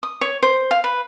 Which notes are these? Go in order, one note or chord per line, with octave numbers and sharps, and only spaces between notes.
D#6
C#5
C5
F5
B4